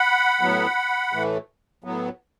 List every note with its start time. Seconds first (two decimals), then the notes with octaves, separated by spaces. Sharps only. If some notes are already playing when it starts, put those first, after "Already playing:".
Already playing: F#5 B5
0.41 A2 F#3 B3
1.13 A2 E3 A3
1.84 A2 F#3 B3